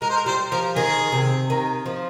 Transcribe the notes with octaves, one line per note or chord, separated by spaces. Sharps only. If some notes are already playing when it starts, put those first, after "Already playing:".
G#3 A#4
C5
A#4
G3 C5
F3 A#4
D#3 G#4
C3
D#3
F3